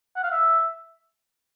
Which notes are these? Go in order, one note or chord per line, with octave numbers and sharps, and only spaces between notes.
F#5
F5
E5